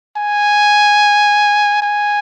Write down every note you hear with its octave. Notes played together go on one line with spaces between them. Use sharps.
G#5
G#5